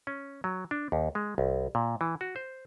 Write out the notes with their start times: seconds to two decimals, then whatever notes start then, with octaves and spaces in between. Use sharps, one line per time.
0.07 C#4
0.44 F#3
0.71 D4
0.92 D#2
1.15 G#3
1.38 C2
1.75 A#2
2.01 E3
2.21 F#4
2.36 C5